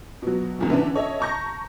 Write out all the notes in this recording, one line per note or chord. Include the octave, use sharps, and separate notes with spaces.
B2 F#3
G#1 E2 A#2
D3 E3 C#4 D4
A4 C#5 D#5 E5
A5 A#5 C#6 G6 A#6